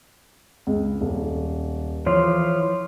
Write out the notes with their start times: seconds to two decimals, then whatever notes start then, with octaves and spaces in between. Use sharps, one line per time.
0.67 C#2
1.01 D#1
2.06 E3 F3 F4 C#5